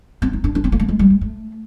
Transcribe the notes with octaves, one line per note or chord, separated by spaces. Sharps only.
C4
D#4
D4
D4
C4
A#3
A3
G#3
G3
G#3
A3